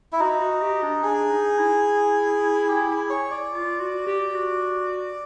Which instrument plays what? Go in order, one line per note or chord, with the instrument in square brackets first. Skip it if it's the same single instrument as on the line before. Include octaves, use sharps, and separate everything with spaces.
[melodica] E4
[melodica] D#4 [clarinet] F#4
[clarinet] F#4
G4
D4
[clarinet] D4 [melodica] G#4
[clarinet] D#4
E4
[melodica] G4
G#4
C#5
D5
[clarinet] F4
F#4
G4
F#4